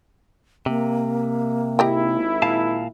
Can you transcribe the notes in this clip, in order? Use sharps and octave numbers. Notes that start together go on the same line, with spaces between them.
C3 A#3
G#1 E4 G4 D#5 G5
A#2 F5 A5